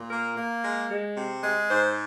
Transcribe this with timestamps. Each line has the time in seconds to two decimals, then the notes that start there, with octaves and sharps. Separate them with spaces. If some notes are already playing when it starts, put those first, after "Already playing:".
Already playing: A#2
0.09 A#3 A#4
0.36 A#3
0.63 G#3
0.89 G#3
1.16 C3
1.42 G#3
1.69 G#2 C5